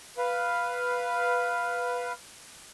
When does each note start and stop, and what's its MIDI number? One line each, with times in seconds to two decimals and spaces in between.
0.18 2.12 71
0.18 2.12 77